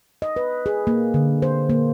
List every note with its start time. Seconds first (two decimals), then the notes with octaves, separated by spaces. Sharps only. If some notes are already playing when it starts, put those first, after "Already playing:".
0.22 D#5
0.36 B4
0.66 G#4
0.87 A#3
1.14 D3
1.42 C5
1.70 A#3